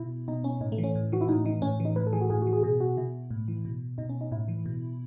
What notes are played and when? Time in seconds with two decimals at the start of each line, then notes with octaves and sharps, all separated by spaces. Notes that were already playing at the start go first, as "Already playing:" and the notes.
Already playing: B2 E4
0.28 B2 D#4
0.44 C#4
0.61 A2 D#4
0.72 A3
0.78 E3
0.84 C#4
0.95 A2
1.12 E3 F#4
1.21 E4
1.28 A2 D#4
1.45 E3 D#4
1.62 A2 C#4
1.80 E3
1.85 D#4
1.96 A2 B4
2.07 A4
2.13 E3 G#4
2.21 F#4
2.30 A2 G#4
2.42 F#4
2.47 E3
2.53 G#4
2.63 B2 G#4
2.80 F#4
2.97 B2 E4
3.31 A2
3.48 E3
3.65 B2
3.98 B2 D#4
4.09 C#4
4.21 D#4
4.31 A2 E4
4.48 E3
4.66 B2